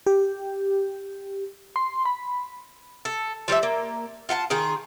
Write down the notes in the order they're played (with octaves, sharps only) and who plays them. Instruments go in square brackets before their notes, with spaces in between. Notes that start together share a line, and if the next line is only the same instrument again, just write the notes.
[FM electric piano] G4
C6
B5
[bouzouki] A4
F3 G3 D5 E5
A#3
F4 F#5 G5 A5
D#3 F4 G#4